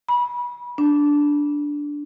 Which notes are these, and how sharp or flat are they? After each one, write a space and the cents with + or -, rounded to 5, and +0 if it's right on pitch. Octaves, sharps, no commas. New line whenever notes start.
B5 -30
D4 -5